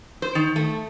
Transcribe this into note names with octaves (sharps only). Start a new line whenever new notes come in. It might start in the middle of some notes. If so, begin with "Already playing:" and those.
C5
D#3
A3